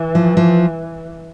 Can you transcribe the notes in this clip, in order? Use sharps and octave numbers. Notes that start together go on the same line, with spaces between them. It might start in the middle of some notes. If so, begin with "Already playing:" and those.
Already playing: E3
F3
F3